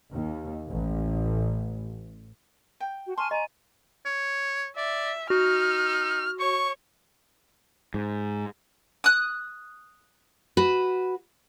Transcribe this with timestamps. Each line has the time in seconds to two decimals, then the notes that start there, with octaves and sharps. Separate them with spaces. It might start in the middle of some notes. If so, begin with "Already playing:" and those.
0.13 D#2
0.69 A1
2.80 G5
3.06 F#4
3.18 G#5 A5 C6 C#6 F6
3.31 D#5 G#5 A#5
4.06 C#5
4.77 D5 E5
5.30 D#4 F#4 F6
6.40 C#5 C#6
7.94 G#2
9.04 D#6 F#6
10.57 F#4 B4